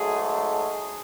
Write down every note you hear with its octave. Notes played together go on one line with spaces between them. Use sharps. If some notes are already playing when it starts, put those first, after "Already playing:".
Already playing: G#2 F#3 A3 G#4
G#4